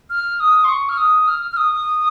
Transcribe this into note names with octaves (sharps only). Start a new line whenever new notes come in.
F6
D#6
C6
C#6
F6
D#6
F6
F6
D#6